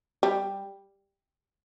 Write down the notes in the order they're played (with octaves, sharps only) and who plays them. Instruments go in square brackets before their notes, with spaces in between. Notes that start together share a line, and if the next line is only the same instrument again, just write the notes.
[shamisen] G3